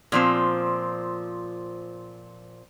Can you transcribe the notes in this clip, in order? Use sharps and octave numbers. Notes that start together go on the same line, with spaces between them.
A#2 F3 C4